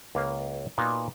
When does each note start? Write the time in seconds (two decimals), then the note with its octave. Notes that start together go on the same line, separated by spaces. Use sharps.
0.15 C#2 A#3 C#4 A#4 B4 F5
0.78 A#2 A#3 B3 D#4 F#4